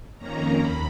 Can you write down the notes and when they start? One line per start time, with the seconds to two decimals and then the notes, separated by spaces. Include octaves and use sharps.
0.18 F2 D#3 A#3 C#4 A#5
0.59 D#2 B5